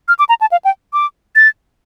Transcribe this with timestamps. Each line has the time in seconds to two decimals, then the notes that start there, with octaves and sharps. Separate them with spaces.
0.08 F6
0.19 D6
0.29 A#5
0.41 A5
0.52 F5
0.65 G5
0.93 D6
1.36 A6